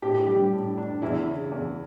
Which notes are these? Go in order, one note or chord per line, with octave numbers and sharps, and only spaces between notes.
A2 G4
G4
G3 G4
A2
D4
E2 E4
C#3
E2